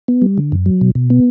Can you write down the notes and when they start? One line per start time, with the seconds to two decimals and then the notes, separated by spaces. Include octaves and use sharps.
0.08 B3
0.22 G3
0.38 D3
0.52 F#2
0.66 F#3
0.81 B2
0.95 B2
1.10 B3